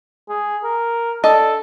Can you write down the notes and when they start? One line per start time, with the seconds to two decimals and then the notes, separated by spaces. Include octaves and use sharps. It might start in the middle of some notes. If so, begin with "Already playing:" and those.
0.29 G#4
0.64 A#4
1.24 D4 A4 D#5 A5